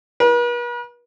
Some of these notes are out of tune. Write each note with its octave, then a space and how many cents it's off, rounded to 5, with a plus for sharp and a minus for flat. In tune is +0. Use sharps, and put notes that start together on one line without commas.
B4 -45